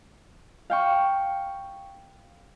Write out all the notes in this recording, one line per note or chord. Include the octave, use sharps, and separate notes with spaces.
F5 G5 C#6